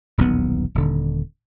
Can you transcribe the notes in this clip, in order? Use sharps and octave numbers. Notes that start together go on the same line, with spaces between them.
D#1 B1 E2 B3
D#1 D3